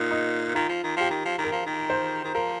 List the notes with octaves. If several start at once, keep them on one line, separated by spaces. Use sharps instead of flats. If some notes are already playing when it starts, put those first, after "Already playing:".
Already playing: A#2 D#4
D#4
D#3 F4
F3
D#3
F3 G4
D#3
F3
D#3
A#4
F3
D#3
C5
D#3
F3 A#4